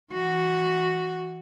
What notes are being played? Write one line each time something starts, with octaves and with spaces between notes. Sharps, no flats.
E3 F#4